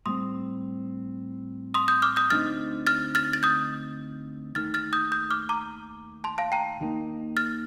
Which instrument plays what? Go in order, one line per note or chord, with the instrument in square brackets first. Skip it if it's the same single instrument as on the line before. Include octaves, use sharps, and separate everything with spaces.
[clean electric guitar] A2 G3 C4 [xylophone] C6 D#6
[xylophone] C6 D#6
D#6 G6
D6 F6
D#6 G6
[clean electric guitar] D2 D3 A3 C4 D#4 [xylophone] F6 A6
[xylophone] F6 A6
F6 A6
A6
D#6 G6
[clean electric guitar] D#2 D#3 A3 [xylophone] F6 A6
[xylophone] F6 A6
D#6 G6
D#6 G6
D6 F6
A#5 D6
A5 C6
F5 A5
G5 A#5
[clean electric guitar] D#2 D#3 A#3 D#4
[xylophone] F6 A6